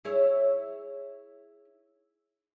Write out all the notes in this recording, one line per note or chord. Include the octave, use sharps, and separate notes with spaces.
E4 G#4 C#5